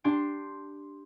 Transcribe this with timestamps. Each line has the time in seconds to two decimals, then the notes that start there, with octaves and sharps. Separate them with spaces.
0.04 D4 G4 C6 G6 D7